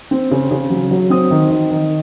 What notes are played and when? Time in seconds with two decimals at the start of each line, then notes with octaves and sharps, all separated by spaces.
0.11 C4
0.31 C#3
0.51 C#3
0.70 F#3
0.91 F#3
1.10 C4 D#6
1.31 D#3
1.50 D#3
1.71 D#3